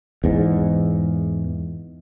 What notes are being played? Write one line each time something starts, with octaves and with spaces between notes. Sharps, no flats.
E2 G#2